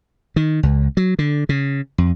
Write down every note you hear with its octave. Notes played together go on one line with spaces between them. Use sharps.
D#3
C#2
F#3
D3
C#3
F2